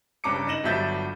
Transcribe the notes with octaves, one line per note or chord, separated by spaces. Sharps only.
F#1 G2 C#4 A#5 D6 C#7
D#4 A#6 E7 F#7
G1 G2 F#3 E5 G6 A6